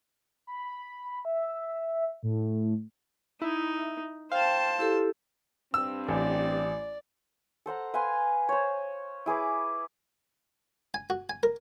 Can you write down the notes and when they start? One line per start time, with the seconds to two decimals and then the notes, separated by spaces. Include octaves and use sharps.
0.47 B5
1.25 E5
2.23 A2
3.42 D#4 E4
4.32 C5 F5 G5 A5
4.79 E4 G4 A4
5.74 G2 C4 E6
6.09 A1 D5
7.66 A4 C5 F#5 A#5
7.94 B4 F5 G#5 C6
8.49 C5 C#5
9.26 E4 G#4 B4 D6
10.94 G#5
11.10 F#4
11.30 G#5
11.43 A#4